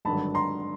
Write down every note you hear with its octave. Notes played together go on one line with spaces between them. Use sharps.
G#1 G2 D3 F#3 A5 B5
A#5 C6